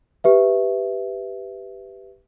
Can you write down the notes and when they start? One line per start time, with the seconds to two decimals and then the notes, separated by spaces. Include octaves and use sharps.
0.24 G4 B4 E5